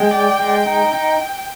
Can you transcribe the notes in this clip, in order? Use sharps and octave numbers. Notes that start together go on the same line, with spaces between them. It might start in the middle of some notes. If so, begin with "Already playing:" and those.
Already playing: G#3 G5
D5
G#3
D#4
D#4